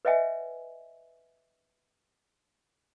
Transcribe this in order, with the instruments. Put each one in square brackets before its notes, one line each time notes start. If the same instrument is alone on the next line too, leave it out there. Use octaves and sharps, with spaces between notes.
[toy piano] B4 C#5 D#5 E5 F#5 G#5